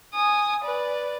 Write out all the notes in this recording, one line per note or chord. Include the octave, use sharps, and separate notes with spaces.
G#5 D#6
B4 D5